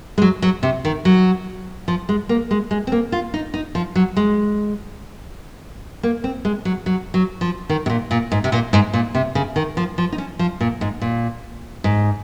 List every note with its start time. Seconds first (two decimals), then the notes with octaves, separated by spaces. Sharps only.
0.18 G#3
0.22 F#3
0.42 F#3
0.63 C3
0.85 D#3
1.05 F#3
1.88 F3
2.09 G#3
2.29 A#3
2.51 G#3
2.71 G#3
2.87 C4
2.92 A#3
3.12 F4
3.34 D#4
3.54 D#4
3.75 F3
3.95 F#3
4.16 G#3
6.03 A#3
6.24 C4
6.45 G#3
6.65 F#3
6.86 F#3
7.14 F#3
7.41 F3
7.69 D#3
7.86 C3
7.90 A#2
8.11 A#2
8.32 G#2
8.44 C3
8.52 A#2
8.73 G#2
8.93 A#2
9.15 C3
9.35 C#3
9.56 D#3
9.77 F3
9.98 F3
10.12 D#4
10.18 C#4
10.39 F3
10.61 A#2
10.81 G#2
11.01 A#2
11.84 G#2